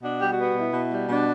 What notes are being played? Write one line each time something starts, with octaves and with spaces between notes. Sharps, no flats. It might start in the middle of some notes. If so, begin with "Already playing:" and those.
B2 D4
G3 G4
F#4
B3
B2 E4
B2
G3
B2 D4